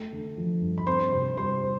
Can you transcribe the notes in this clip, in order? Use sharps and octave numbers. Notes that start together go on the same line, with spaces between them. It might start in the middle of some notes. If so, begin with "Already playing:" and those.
Already playing: A3
D3
F3
G2
B5
C4 C5 C6
C3
G3 C5 C6